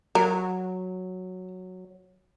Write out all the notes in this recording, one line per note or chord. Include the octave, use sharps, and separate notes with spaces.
F#3 A#4